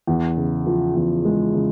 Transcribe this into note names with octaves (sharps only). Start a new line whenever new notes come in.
E2
C#3
F3
E2
G#3
C#3